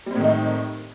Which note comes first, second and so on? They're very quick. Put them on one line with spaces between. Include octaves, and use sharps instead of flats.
G3 C4 A2 D#3 D#4